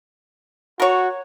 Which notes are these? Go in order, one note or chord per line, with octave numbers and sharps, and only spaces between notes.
F#4 A#4 C#5